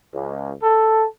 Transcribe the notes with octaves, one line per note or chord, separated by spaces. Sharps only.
C#2
A4